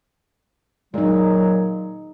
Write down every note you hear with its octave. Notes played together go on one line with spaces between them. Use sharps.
A#2 F#3 G#3 D#4